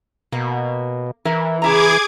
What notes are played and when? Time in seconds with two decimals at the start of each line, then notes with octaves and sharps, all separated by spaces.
0.32 B2 A#3
1.25 E3 E4 A#4
1.62 C#3 E4 G#4 A#5 D6 G#6